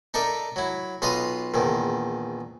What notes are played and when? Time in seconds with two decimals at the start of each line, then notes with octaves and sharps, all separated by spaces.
0.14 D#4 A4 A#4 D5 E5
0.56 F#3 E4
1.02 B1 F4 B4 D#5 F5 D#6
1.54 A#1 E2 D#3